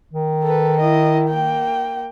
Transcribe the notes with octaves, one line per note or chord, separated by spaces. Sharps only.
D#3
A4 B4
E4 D#5
A#3 G5